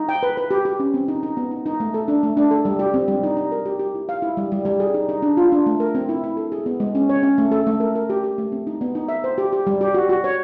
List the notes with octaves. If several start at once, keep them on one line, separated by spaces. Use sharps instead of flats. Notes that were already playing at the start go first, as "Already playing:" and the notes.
Already playing: D#4
G5
B4
B4
G4
G4
C#4
C4
D#4
D#4
B3
D#4
D#4
A3
A4
D4
A3
D4
A4
G3
G4
C4
G3
D#4
D#4
A#4
G4
G4
E4
F5
E4
G3
G3
G3
G#4
D#4
D#4
D4
F4
D4
A3
A#4
C4
E4
E4
A4
G#4
B3
G#3
C#4
C#5
C#4
A3
A4
A3
A#4
A#4
G4
G4
A3
C4
D#4
B3
D#4
E5
C5
G4
G4
G3
G4
F#4
F#4
C#5